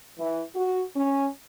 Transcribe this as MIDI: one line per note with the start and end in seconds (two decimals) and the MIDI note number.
0.19 0.42 52
0.56 0.84 66
0.96 1.28 61